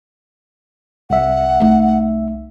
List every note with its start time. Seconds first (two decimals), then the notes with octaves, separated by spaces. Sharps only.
1.10 C2 E5 F#5
1.60 A3 D#4